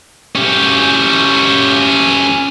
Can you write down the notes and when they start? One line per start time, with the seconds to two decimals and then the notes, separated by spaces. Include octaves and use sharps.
0.36 C#4 G4